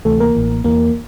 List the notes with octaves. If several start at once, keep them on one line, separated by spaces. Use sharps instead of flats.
D2 C3 E3 A3 A4
A#3 A#4
A1 A2 E3
E2 E3 A#3 A#4